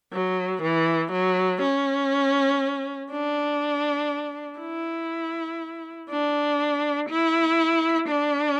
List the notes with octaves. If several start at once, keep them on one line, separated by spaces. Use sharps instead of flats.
F#3
E3
F#3
C#4
D4
E4
D4
E4
D4